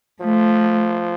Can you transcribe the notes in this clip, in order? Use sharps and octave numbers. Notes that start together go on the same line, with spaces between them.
F3 A3